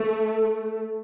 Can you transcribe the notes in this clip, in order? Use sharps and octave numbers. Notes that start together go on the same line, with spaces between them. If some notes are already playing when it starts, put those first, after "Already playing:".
Already playing: A3